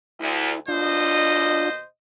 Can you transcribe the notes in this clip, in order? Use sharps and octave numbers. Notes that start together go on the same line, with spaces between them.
D2 E4
D#2 B2 D4 F4 C5 D#5